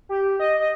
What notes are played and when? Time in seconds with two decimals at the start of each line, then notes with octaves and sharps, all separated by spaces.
0.09 G4
0.40 D#5
0.60 D#5